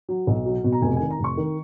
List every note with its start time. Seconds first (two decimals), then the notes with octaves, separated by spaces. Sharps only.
0.09 F#3
0.27 B1
0.46 F#3
0.64 B2
0.72 A#5
0.82 F1 G#5
0.96 D#3 G#5
1.10 A#5
1.19 F1
1.24 C#6
1.37 D#3